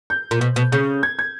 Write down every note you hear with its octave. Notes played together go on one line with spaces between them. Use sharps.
G6
A#2
B2
B2
C#3 G6
G#6
G#6